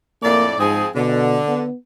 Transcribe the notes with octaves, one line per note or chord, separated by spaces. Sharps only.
F2 A2 A#3 D5
G#2 F3 C4 G#4
B2 D3
B3